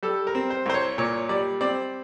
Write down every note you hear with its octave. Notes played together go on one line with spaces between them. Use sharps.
G3 A4
A#4
C4
C5
C2 C5
C#5
A#2 C#5
G3 D5
C4 D5